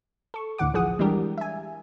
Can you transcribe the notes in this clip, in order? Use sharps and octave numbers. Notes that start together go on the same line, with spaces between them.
A4 C#6
D2 A2 D3 E3 F#5 D6
A1 E3 F3 G#4 F#5 D#6
E3 G3 G#3 D4 G4 A#4
E5 G#5